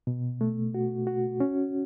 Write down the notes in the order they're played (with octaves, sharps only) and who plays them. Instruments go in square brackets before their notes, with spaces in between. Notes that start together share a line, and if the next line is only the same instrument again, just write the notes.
[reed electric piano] B2
A3
F#4
F#4
C#4